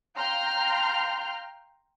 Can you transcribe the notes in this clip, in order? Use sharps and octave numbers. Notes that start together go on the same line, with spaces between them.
F5 G5 A#5 C6 F6 G6